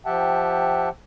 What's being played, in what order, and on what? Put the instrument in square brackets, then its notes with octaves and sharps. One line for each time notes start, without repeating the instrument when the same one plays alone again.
[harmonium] F3 G4 E5 F#5 G5 A5